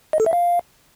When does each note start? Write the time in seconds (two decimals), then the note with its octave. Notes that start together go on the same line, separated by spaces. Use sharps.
0.13 D#5
0.20 A4
0.26 E5
0.33 F5